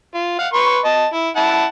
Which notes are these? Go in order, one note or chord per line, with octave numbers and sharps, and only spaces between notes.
F4
F5 F#5
B4 C6 C#6
D#5 A5
E4
E4 F#5 A5